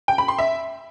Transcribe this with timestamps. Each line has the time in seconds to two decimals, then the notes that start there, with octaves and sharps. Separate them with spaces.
0.08 G5
0.18 B5
0.28 C6
0.39 E5